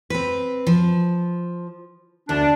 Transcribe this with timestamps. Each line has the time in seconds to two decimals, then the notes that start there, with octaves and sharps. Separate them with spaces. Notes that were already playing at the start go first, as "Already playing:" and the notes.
0.10 C4 B4
0.67 F3
2.29 D2 D4